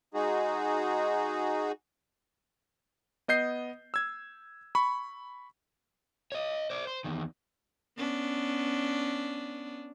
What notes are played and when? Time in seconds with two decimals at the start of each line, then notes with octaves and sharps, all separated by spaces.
0.14 G#3 D#4 F#4 G#4
3.28 B3 D#5 G6 C7
3.94 E6 G#6
4.75 B5 C#6
6.32 C#5 D#5
6.70 C5 D5
6.87 C5
7.04 E2 D#3
7.98 B3 C#4 D4